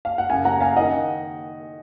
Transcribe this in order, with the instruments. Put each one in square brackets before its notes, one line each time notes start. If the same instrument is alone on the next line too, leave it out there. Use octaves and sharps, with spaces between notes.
[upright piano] F5
F#5
F#2 C#3 F5 G#5
F#5 A#5
F5 G#5
D#3 D#5 F#5